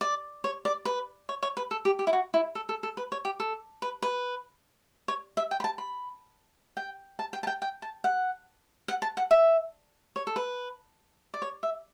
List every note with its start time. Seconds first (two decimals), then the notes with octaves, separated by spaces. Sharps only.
0.01 D5
0.44 C#5
0.65 D5
0.85 B4
1.29 C#5
1.43 C#5
1.57 B4
1.71 A4
1.85 G4
1.99 G4
2.07 E4
2.13 F#4
2.34 E4
2.55 A4
2.69 A4
2.83 A4
2.97 B4
3.12 C#5
3.25 G4
3.40 A4
3.82 B4
4.02 B4
5.08 C#5
5.37 E5
5.51 G5
5.60 B5
5.64 A5
5.78 B5
6.77 G5
7.19 A5
7.33 G5
7.43 A5
7.47 G5
7.62 G5
7.82 A5
8.04 F#5
8.88 F#5
9.02 A5
9.17 F#5
9.31 E5
10.16 C#5
10.27 A4
10.36 B4
11.34 D5
11.42 C#5
11.63 E5